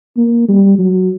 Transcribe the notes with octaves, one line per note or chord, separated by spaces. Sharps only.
A#3
G3
F#3